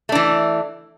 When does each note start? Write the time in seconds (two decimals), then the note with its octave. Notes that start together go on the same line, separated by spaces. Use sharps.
0.09 A3
0.12 D4
0.15 E3